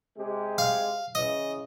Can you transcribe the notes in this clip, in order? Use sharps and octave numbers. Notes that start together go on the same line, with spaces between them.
C3 G#3 G4
F5
C#3 E3 D#5